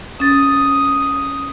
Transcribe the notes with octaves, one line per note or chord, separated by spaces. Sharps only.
C#4 D#6 A6